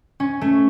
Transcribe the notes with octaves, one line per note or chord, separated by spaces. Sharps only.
C#4
A3